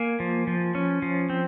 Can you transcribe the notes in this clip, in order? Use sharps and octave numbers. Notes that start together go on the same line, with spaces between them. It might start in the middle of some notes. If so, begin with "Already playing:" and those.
Already playing: A#3 G#5
F3
F3
C#4
F3
C4